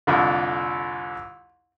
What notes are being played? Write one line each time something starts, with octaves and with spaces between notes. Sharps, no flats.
C2 F2 D3